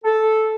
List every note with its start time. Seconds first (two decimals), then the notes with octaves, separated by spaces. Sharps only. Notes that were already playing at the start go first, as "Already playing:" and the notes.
0.05 A4